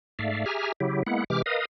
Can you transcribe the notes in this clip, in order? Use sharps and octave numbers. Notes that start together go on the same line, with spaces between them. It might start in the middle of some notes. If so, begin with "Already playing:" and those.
G#2 A3 D5 E5 F5
G4 G#4 E5 G#5 A#5 F6
C#3 F#3 E4 G4
G#3 A#3 B3 E4 F#5
C3 E3 G#3 G4 D6 F6
A#4 B4 D#5 F5 D#6